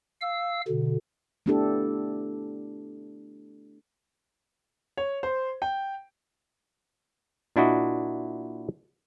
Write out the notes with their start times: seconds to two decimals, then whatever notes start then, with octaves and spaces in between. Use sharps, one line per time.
0.21 F5 E6
0.68 B2 D3
1.46 A3 B3 D4 E4 G4 A4
4.97 C#5
5.23 C5
5.62 G5
7.56 A#2 D4 E4 F#4 D#5